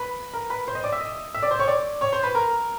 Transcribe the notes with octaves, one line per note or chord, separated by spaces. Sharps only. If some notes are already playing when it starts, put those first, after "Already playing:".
Already playing: B4 B5
A#4 A#5
B4 B5
C5 C6
D#5 D#6
D5 D6
E5 E6
D#5 D#6
E5 E6
D5 D6
C5 C6
C#5 C#6
D5 D6
C#5 C#6
C5 C6
B4 B5
A#4 A#5